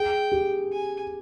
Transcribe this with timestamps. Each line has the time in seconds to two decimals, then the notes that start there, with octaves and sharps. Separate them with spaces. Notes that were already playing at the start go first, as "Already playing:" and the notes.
Already playing: G#4 G5
0.32 G4
0.72 G#5